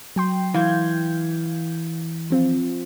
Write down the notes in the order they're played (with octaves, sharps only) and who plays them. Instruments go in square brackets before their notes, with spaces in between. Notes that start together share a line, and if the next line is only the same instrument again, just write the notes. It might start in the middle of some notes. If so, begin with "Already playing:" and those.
[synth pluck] F#3 G5 C6
[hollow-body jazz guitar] E3 [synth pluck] F5 G6 G#6
[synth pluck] F3 C4 F4